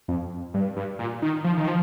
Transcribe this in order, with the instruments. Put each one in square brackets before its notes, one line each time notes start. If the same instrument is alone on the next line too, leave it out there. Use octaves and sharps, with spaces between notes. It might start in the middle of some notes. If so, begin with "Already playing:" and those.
[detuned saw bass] F2
G2
G2
A#2
D#3
F3
D#3
F3